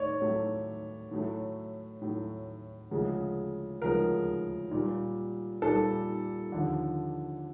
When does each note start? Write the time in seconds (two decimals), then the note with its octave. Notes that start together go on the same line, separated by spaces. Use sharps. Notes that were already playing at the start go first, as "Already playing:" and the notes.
Already playing: A2 A3 C#5 D5
0.21 A2 F#3 A3
1.11 A2 F#3 A3
2.02 A2 F#3 A3
2.91 D2 C#3 F3 G#3
3.82 D2 C#3 F3 G#3 A#4
4.71 A#2 G3
5.62 A#2 G3 A4
6.52 D#2 D3 F3